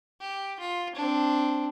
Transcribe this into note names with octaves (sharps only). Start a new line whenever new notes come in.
G4
F4
C4 D4